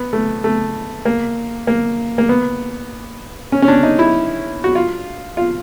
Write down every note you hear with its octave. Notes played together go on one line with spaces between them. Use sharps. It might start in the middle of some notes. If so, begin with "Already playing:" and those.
Already playing: B3
A3
A3
A#3
A#3
A#3
B3
C#4
C#4
D4
D#4
E4
F#4
F4
F4